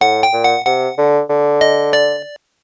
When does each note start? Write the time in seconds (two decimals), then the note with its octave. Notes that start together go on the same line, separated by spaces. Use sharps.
0.01 A2 F#5
0.23 G5
0.33 A#2
0.44 F#5
0.65 C3 F#5
0.98 D3
1.29 D3
1.61 D#5
1.93 D5